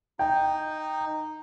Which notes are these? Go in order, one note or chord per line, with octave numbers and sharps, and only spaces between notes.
D#4 G5